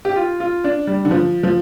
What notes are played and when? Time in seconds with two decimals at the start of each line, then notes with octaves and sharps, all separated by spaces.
0.05 G4
0.16 F4
0.40 F4
0.64 D4
0.87 G3
1.05 D3
1.11 F3
1.43 F3